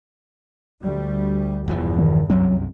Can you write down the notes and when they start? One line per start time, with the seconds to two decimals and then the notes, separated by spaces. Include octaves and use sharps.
0.83 D2 G3
1.68 E1 E2 G2 E3 F3
1.99 D#3
2.30 C2 F#2 C3 F#3